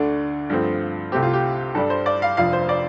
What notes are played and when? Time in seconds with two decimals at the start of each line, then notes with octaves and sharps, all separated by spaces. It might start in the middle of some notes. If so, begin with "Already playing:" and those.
Already playing: D2 D3 A3 D4
0.50 G2 F3 A3 C4
1.12 C2 C3 A3 C4 G4
1.23 F4
1.33 G4
1.75 G2 G3 D4 A4
1.90 C5
2.06 D5
2.22 F5
2.37 F1 F2 F3 D4 F5
2.53 C5
2.69 D5